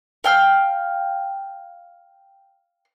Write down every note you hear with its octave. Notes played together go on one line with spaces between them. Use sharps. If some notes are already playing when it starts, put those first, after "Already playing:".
F5 G5 F6